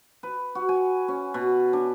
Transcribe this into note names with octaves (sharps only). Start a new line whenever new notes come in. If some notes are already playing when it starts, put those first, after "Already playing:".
B4
F#4
G#5
C#4
B2
D4